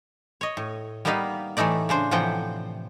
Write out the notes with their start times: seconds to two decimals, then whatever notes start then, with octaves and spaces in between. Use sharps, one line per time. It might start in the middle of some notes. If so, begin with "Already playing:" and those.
0.41 C#5 D#5
0.57 A2
1.05 G3 A#3 B3 D#4 B4 F5
1.57 A2 E3 A3 D#4 D5
1.89 C#3 D4 C5
2.11 A2 C3 E3 F3 F#5 G5